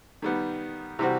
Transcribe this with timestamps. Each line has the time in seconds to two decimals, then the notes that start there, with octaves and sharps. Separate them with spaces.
0.22 D#3 G3 B3
0.99 C3 E3 G3 C4 F#4